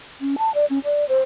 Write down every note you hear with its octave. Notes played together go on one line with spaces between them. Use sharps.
C#4
A5
D5
C#4
D5
C5